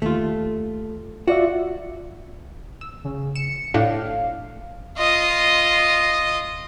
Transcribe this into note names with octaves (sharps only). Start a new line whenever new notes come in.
D#2 A3 F4
F4 F#4 D5 E5
E6
C#3
C#7 E7
A2 D4 F5
F4 D#5